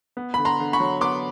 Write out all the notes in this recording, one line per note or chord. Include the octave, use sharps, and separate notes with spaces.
B3
D3 B5
A#5 C6
D3
B5 C#6
F#3
B3 C6 D6